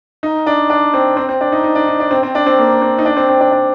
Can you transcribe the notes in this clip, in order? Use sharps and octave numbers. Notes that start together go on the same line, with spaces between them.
D#4
D4
D4
C4
C4
C4
D4
D#4
D#4
D4
D#4
D4
C4
C4
D4
C4
A#3
C4
D#4
D4
C4
C4
D4
D4